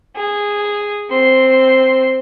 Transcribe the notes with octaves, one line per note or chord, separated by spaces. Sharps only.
G#4
C4 C6